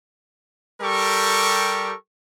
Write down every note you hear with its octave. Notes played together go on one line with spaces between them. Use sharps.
G3 G4 A4 A#4 C#6